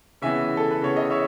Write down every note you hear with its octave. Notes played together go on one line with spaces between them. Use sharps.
C#3 E3 B3 E5 G#5
A4
B4
C#3 E3 B3 C#5
D#5
C#5 E5